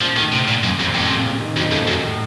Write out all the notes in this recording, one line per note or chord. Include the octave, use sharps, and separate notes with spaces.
F#2 A#2 F3
A2 D#3
C3
A#2
F#2
F2 C3
A#2
F2 A2
A2 C3
A#2 C#3
C3 D#3
F2 D#3 F#3
F#2 F3 A3
F#2 D#3 F#3
A2